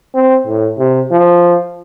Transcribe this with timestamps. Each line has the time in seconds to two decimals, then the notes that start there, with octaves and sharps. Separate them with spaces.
0.15 C4
0.47 A2
0.79 C3
1.11 F3